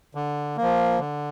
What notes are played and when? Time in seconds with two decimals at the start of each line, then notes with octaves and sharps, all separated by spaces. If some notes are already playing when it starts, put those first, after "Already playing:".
0.15 D3
0.57 F3 A#3
0.99 D3